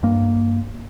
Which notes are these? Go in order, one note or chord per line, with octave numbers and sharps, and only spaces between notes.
G2 A#3